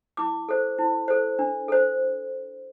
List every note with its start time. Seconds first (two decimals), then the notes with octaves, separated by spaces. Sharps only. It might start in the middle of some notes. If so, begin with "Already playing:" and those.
0.17 E4 D6
0.49 A4 C5
0.78 E4
1.08 A4 C5
1.39 D4
1.68 A4 C5